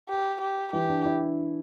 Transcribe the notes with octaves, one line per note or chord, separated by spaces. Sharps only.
G4
G4
E3 G4
D4
E4